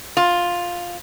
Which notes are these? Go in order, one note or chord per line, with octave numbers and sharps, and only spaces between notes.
F4